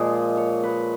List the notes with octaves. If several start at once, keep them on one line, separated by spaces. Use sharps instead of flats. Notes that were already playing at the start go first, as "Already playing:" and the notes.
Already playing: A#2 F3 G#3 D#5
C#5
B4